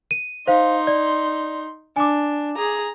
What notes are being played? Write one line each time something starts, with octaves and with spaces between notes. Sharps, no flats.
D#7
D#4 C5 F5 C6
D5
D4 G#5 D6
G#4 A#5